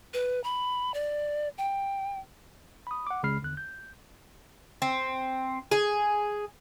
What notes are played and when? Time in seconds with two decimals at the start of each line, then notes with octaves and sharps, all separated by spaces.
0.13 B4
0.44 B5
0.94 D5
1.58 G5
2.87 B5 D#6
3.07 F#5 D6
3.23 C#2 C#3 G#3 B5 F6 C7
3.42 E2 D3 F#6
3.57 G6
4.82 C4
5.71 G#4